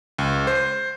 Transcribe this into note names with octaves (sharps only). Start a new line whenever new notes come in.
C#2
C5